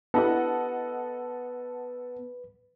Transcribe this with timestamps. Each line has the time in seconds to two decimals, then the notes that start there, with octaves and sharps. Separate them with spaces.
0.14 B3 D4 E4 G4 A4 B4 D#5 F#5